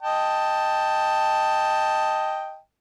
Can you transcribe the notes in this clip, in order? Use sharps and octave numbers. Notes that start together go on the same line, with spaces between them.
D#5 G5 A5